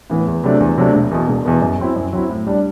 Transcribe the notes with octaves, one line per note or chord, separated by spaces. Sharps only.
A2 E3 B3
E2
C3 F#3 A3 D4
E2
C3 F#3 A3 D4
E1
E2 B2
E1
E2 B2
F#2
F#3 C4 E4
F#2
F#3 C4 E4
A2
G3 D4